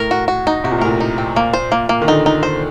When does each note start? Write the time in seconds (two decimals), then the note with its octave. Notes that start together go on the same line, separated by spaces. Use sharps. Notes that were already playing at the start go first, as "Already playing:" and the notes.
Already playing: A2 A#4
0.11 F#4
0.28 F#4
0.47 D#4
0.64 C3 F#4
0.71 A#2
0.78 A2
0.81 A#2 A#4
1.00 D#4
1.18 C4
1.36 A#3
1.53 C5
1.72 A#3
1.89 A#3
2.01 D#3
2.08 D3 D#4
2.26 D#4
2.43 C5